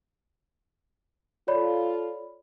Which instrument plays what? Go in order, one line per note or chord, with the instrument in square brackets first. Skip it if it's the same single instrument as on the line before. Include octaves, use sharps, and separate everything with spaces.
[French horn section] F4 A4 [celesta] C#5 D5 B5